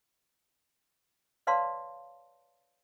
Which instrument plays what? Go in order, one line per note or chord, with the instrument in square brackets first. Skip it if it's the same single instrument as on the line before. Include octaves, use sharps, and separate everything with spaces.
[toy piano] B4 C#5 D5 F5 A5 C6